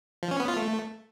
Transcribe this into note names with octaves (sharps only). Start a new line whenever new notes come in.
F3
C#4
B3
F4
A3